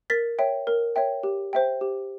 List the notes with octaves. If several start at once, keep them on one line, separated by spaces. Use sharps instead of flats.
A#4 A6 B6
C#5 E5 G5
A#4
C#5 E5 G5
G4
C5 E5 G5
G4